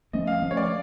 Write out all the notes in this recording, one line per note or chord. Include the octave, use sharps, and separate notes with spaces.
F3 A3 C#4 D#5
F5
F3 A3 C#4
C#5
D5